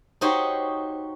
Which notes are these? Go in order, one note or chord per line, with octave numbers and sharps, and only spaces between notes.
D#4 F#4 G4 C5 C#5